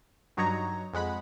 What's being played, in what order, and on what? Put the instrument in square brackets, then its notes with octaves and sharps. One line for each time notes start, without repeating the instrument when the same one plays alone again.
[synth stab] G2 F#3 D#4 C#5 A#5
F2 G#3 F#5 B5